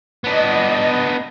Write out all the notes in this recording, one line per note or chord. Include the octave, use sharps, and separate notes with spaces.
B3 D4 D#5